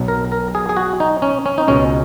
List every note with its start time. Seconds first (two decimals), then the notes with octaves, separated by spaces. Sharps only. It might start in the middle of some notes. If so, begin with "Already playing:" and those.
Already playing: B1 B2 F#3
0.08 A#4
0.32 A#4
0.55 G#4
0.69 G#4
0.77 F#4
1.00 D#4
1.22 C#4
1.46 C#4
1.58 D#4
1.68 C#2 B2 G#3 C#4